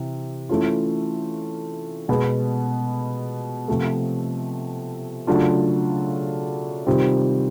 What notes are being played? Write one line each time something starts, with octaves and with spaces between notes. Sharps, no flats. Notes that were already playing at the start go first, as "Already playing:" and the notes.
Already playing: C3 E3
E3 A3 C#4 F4
B2 G#3 B3
C3 F3 A3
C#3 F#3 A3 D4 F4
C3 D#3 G3 C4 F4